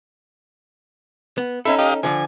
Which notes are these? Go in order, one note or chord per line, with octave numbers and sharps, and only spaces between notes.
B3
C#4 D#4 A4 E5 B5
G4 D#5 F5
D3 F3 G#5